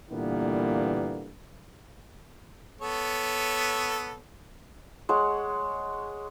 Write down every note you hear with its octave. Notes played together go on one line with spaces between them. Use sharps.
A#2 D3 E3 G3 A#3 B3
B3 A4 C#5
G#3 C#5 F#5